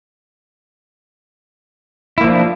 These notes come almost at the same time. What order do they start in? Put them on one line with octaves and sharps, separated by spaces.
E4 A#3 F3 D4